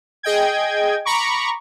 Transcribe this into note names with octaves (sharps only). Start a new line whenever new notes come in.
G#4 D#5 G5 G#6
A#5 B5 C#6 D6